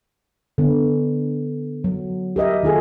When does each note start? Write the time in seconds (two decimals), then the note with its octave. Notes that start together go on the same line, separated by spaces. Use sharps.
0.58 D3 B3
1.84 F#3
2.36 G4 A#4 D#5 E5
2.63 D#3 F4 G#4 A4